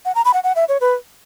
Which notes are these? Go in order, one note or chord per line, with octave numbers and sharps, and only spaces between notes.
F#5
A#5
B5
F#5
F#5
E5
C#5
B4